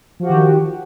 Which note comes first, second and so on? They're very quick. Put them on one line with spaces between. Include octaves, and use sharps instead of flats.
F3 F#4 G4 D#3